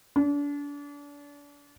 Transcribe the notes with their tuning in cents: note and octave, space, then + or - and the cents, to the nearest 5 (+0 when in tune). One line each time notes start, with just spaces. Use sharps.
D4 -35